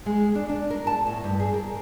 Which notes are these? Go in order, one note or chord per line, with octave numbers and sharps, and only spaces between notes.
G#3
D4
D4
A#4
A5
A2
G2
G#4
A#4